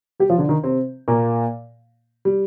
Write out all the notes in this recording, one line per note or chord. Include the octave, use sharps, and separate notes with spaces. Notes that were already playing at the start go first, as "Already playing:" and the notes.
G3 G4
F3 F4
D3 D4
D#3 D#4
C3 C4
A#2 A#3
G3